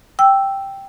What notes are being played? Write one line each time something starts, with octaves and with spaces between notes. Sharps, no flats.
G5 E6